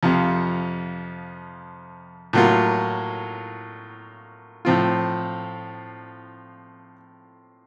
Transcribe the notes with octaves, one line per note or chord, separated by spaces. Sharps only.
F2 C3 F3
A2 F#3 A#3 F4
A2 F3 C4 F4